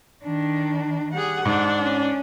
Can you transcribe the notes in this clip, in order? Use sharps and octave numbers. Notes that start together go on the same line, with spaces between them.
D#3 D4
G3 G#4 F#5
G#2 D4
C#4